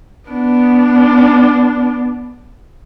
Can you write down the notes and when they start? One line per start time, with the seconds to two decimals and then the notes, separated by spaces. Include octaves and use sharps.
0.29 B3 D4